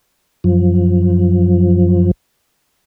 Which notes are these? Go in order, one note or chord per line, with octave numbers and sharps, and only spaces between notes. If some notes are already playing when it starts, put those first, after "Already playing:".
F#2 F3